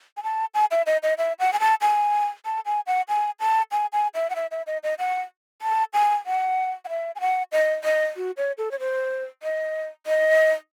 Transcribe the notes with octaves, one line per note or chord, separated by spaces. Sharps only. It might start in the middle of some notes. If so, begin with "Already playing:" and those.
G#5
A5
G#5
E5
D#5
D#5
E5
F#5
G#5
A5
G#5
A5
G#5
F#5
G#5
A5
G#5
G#5
E5
F#5
E5
E5
D#5
D#5
F#5
A5
G#5
F#5
F#5
E5
G#5
F#5
D#5
D#5
F#4
C#5
A4
C#5
C5
D#5
D#5